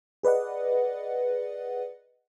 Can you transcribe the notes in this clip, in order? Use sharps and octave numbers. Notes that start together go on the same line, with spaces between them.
G#4 B4 D5 D#5 F#5